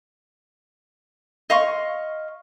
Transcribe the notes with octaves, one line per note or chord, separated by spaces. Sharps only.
D#5 F5 C6 C#6